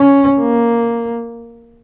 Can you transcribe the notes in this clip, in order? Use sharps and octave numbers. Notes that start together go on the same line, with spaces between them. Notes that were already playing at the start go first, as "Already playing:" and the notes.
Already playing: C#4
A#3